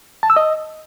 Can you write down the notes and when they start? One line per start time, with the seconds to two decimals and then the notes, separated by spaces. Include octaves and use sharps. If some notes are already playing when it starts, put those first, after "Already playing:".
0.23 A5
0.30 E6
0.36 D#5